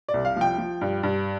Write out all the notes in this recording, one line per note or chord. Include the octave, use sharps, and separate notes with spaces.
D5
C2
F5
F3 G5
F3
G2
G2